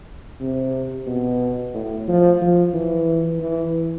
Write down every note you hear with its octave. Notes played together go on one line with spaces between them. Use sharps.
C3
B2
A2
F3
F3
E3
E3